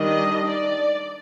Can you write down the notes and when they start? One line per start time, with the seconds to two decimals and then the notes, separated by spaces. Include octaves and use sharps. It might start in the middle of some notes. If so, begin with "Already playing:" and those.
Already playing: D#3 G3 D4 D#5
0.48 D5